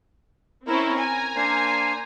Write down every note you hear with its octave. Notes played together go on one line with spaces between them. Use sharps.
C4 C#4 E4 A#4
G#5 A#5
A#3 D4 C5